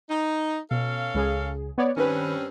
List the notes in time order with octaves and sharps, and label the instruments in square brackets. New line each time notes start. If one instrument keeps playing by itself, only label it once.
[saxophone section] D#4
[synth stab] B2 [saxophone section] C#4 A4 F5
[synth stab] C#2 C#3 G#4
B3 C#5 D5
[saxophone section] G2 C4 C#4 [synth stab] D#3 B4